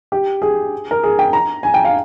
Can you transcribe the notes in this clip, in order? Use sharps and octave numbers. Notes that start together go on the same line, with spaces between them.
G4
G#4
A#4
G#4
G5
A#5
G#5
G5
F5